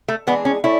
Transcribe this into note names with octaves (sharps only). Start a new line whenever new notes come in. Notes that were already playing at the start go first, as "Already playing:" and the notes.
A3
E3 G#3 B3 D4 G#4
C#4
A3 C#4 E4 D5